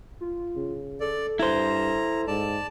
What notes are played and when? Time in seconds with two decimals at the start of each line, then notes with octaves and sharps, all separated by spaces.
0.21 F4
0.56 C#3
1.00 A4 D5
1.39 G2 E4 C5 A#5
2.27 G#2 D5 A5